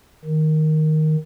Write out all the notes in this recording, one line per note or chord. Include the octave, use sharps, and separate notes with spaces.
D#3